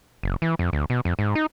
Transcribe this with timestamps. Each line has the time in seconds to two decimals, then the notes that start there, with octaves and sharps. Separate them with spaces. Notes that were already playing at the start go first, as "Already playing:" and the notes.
0.23 F#1
0.42 E3
0.59 F2
0.73 D2
0.90 B2
1.05 F2
1.19 G#2
1.35 D#4